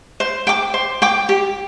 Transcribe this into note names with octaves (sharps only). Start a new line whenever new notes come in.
C5
G5 D6
C5
G5 D6
G4